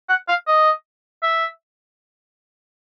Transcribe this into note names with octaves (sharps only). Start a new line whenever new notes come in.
F#5
F5
D#5
E5